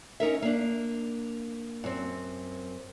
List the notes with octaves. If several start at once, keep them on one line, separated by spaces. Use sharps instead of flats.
C#4 D#4 A#4 E5
A#3 D4
F#2 C4